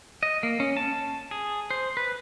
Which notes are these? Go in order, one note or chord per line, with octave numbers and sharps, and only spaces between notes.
D#5
A#3
C#4
A5
G#4
C5
B4